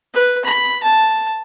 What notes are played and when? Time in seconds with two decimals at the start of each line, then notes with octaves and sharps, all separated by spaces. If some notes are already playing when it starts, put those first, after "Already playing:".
0.14 B4
0.45 B5
0.83 A5